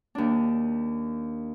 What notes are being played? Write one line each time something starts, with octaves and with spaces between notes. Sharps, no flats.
D#2 D4